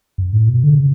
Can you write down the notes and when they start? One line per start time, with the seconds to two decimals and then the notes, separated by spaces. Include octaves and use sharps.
0.18 F#2
0.33 A2
0.48 B2
0.63 D3
0.78 C#3